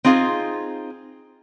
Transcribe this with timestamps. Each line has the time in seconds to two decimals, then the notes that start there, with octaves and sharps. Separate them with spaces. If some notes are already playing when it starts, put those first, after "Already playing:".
0.05 C4 D#4 F4 G#4 F5